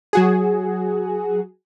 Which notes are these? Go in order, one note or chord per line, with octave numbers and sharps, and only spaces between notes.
F#3 F#4 G#4